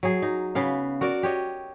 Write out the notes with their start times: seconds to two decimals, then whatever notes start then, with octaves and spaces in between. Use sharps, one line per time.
0.03 F#3 G#4
0.22 D#4
0.55 C#3 B3 F5
1.01 F#4 A#4 D5
1.23 G4 C#5 D#5